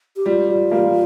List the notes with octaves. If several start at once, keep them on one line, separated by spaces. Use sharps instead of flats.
G4
G3 F4
G3
G3 A#3